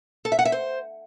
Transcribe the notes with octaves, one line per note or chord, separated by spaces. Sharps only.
A4
E5
F#5
E5
C5